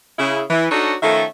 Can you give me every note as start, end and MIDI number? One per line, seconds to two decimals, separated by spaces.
0.19 0.42 49
0.19 0.42 64
0.50 0.66 52
0.71 0.95 62
0.71 0.95 63
0.71 0.95 66
0.71 0.95 69
0.71 0.95 73
1.03 1.25 51
1.03 1.25 53
1.03 1.25 57
1.03 1.25 61
1.03 1.25 69
1.03 1.25 76